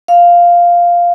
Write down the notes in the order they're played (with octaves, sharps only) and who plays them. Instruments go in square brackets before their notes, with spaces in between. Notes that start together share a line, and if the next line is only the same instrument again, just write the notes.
[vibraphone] F5